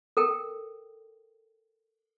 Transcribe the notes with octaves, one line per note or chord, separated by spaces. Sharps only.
A4 A#4 G5